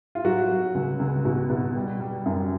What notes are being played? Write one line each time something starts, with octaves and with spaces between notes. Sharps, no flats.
F4
F#3 F#4
F#3
C#2
C#2
B2
B2
G3
G3
F#2